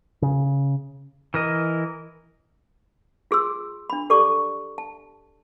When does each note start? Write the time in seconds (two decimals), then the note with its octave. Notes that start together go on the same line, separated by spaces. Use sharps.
0.22 C#3
1.34 E3 A#4 D#5
3.31 F4 G#4 C6 E6
3.90 D4 B5
4.10 G4 A4 D5 A#5 C#6 D6
4.78 A5